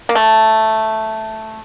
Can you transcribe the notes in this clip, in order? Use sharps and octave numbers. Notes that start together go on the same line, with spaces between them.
A#3
A3